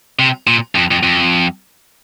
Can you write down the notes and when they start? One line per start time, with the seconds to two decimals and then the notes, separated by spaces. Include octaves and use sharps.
0.19 C3
0.47 A#2
0.75 F2
0.91 F2
1.03 F2